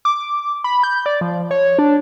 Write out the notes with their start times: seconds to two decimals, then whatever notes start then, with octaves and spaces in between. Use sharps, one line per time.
0.05 D6
0.64 B5
0.83 G6
1.06 D5
1.21 F3
1.51 C#5
1.79 D4